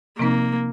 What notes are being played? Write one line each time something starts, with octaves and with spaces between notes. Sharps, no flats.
C3 F3 A#3 C4 D#4